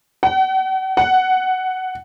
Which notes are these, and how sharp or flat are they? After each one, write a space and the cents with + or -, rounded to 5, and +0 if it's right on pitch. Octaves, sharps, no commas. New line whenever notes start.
F#5 +40
F#5 +10